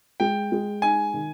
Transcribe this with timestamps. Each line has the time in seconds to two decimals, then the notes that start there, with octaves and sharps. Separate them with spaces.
0.20 G#3 G5
0.52 G#3
0.82 D#4 G#5
1.14 D#3